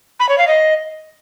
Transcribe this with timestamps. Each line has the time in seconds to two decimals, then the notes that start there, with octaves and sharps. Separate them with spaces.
0.20 B5
0.29 C#5
0.38 F5
0.47 D#5